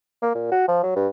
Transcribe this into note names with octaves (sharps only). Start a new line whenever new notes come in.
A#3
A#2
F#4
F3
F#3
G2